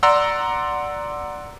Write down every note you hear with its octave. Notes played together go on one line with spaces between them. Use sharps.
D5 F#5 A#5 C6 E6